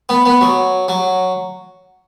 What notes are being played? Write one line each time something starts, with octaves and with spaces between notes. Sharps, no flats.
B3
B3
F#3
F#3